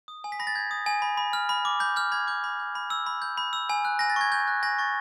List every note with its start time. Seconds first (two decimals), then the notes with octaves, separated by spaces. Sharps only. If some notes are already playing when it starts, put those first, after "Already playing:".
0.08 D#6
0.24 G#5
0.32 B6
0.39 B5 A#6
0.47 A6
0.55 G6 G#6
0.71 D#6
0.86 G#5
1.02 B5
1.17 B5
1.33 F6
1.49 B5
1.65 D6
1.80 B5 G6
1.96 F6 G6
2.12 B5 G#6
2.27 D6 G6
2.44 B5
2.60 G6
2.75 B5
2.90 E6
3.06 B5
3.22 G6
3.37 B5
3.53 E6
3.69 G#5
3.85 F#6
3.99 G#5 A#6
4.10 A6
4.16 C#6 G#6
4.32 G#5 G6
4.48 F#6
4.63 G#5 A#6
4.79 C#6 A6